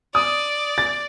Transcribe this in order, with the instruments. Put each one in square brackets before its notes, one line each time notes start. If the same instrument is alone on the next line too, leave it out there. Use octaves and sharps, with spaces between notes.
[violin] D5 [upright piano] D#6
[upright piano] A6